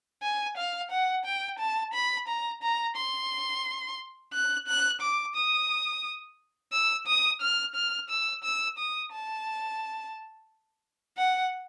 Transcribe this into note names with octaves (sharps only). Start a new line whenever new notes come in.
G#5
F5
F#5
G5
A5
B5
A#5
A#5
C6
F#6
F#6
D6
D#6
E6
D#6
F6
F6
E6
E6
D#6
A5
F#5